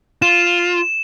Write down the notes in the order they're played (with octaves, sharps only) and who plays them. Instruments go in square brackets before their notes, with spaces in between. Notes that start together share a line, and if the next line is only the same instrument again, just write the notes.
[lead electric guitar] F4 [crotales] E7